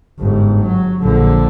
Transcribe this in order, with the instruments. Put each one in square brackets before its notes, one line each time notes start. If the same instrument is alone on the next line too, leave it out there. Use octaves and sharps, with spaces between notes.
[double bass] G1 G#2
F#3
A#1 D3